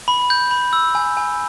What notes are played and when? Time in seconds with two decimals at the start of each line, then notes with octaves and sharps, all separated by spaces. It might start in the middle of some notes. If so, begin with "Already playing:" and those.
0.08 B5
0.30 G6
0.51 B5
0.73 E6
0.95 G#5
1.17 G#5